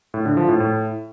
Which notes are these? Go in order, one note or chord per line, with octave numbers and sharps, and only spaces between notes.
A2
D3
F3
A2
A2